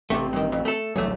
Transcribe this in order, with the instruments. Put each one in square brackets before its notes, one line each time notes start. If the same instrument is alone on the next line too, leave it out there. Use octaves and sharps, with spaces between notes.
[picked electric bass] A1 C4 [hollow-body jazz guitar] C3 A3
[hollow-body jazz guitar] G2 D#3
F2
A3 A4
[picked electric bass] D1 A#1 F#3 [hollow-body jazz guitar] E2 A3